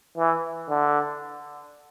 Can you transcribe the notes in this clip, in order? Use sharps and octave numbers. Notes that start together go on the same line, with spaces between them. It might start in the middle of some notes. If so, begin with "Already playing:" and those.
E3
D3